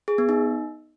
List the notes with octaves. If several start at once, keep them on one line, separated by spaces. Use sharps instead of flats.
G#4
B3
D#4